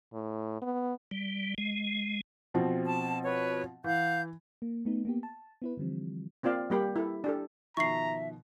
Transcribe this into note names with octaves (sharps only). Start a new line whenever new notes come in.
A2
B3
G3
G#3
B2 F3 C4
A5
B4 C#5
E3 F5 F#5 G6
A#3
A3 B3 D#4
A#3 B3 G4
A5
B3 E4 B4
D3 E3 F3 G3 C4
A#3 C4 F4 D5 F5
G3 A#3 G4 B5
E4 A4
D4 G4 A4
B2 D#3 F3 E5 A#5 C#6 C7